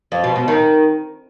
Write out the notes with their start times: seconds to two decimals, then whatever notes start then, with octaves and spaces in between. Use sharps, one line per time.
0.12 F2
0.24 B2
0.36 B2
0.48 D#3